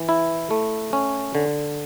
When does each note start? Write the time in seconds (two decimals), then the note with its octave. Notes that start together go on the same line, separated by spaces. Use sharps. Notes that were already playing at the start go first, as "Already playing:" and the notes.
Already playing: E3
0.09 E4
0.51 A3
0.93 C#4
1.35 D3